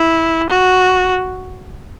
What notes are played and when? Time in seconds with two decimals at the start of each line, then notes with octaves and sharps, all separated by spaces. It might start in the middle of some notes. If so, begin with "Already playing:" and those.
Already playing: E4
0.49 F#4